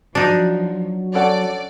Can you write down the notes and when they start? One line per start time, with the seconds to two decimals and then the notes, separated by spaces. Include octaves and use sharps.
0.15 F3 F#3 D4 D#4
1.15 C#4 A4 D5 F#5